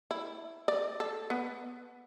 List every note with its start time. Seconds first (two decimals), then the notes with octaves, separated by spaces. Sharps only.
0.11 E4
0.68 D5
1.00 A4
1.30 B3